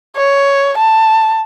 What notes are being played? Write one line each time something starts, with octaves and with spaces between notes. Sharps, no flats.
C#5
A5